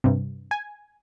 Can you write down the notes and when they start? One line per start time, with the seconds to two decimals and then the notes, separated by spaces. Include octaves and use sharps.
0.04 G2 C3
0.51 G#5